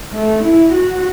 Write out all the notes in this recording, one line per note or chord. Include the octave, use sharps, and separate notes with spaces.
A3
E4
F#4